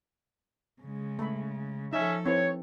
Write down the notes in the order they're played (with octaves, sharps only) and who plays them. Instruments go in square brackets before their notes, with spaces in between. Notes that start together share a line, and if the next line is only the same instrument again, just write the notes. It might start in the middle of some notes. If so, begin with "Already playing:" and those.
[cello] C#3 G#3
[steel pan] A3 B5
[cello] F3 A4 [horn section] C#4 E5 [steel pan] D#4
[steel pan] C4 E4 B4 [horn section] C#5